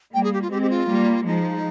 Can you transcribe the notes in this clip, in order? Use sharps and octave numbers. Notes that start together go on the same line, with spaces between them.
G3 A#3 G5
G#4
G4
F4
G#3 C4 G4
G4
F4
G3 A#3
F3 G#3 D#4